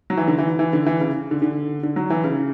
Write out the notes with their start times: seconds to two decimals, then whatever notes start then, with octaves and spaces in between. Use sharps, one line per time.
0.10 F#3
0.17 E3
0.28 D3
0.38 E3
0.59 E3
0.73 D3
0.86 E3
1.01 C#3
1.31 D3
1.42 D3
1.83 D3
1.96 F#3
2.10 E3
2.24 C#3